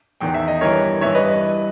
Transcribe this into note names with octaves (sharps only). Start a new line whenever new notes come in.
E2 D#3 G5
E5
D#5
G2 E3 A#4 C#5
G2 E3 C#5 E5
B4 D#5